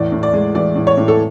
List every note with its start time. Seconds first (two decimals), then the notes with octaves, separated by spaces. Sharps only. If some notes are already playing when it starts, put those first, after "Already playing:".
Already playing: E2 A2 D5
0.12 A2
0.23 D5
0.33 G#3
0.55 E3 D5
0.75 A2
0.87 C#5
0.97 A2
1.08 A4